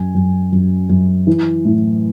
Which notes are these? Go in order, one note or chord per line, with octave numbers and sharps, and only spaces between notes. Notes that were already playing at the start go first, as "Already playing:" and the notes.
Already playing: F#2 G#5
F#2
F#2
F#2
E3
A2